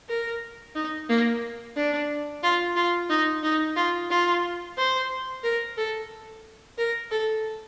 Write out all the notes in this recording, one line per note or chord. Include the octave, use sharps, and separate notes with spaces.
A#4
D#4
A#3
D4
F4
F4
D#4
D#4
F4
F4
C5
A#4
A4
A#4
A4